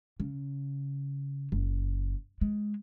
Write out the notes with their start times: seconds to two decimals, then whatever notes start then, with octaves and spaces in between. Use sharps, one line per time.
0.20 C#3
1.52 F#1
2.41 G#3